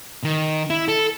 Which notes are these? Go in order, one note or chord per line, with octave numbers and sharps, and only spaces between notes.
D#3
E4
A4